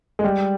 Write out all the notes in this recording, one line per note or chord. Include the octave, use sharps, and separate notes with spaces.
G#3
G3